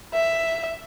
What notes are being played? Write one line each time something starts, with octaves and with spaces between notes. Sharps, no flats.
E5